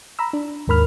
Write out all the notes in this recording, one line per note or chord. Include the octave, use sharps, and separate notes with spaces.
A#5 B5 E6
D4
D#2 G#2 A#4 B5 F6